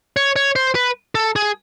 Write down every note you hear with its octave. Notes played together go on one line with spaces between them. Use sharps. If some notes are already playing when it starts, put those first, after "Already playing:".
C#5
C#5
C5
B4
A4
G#4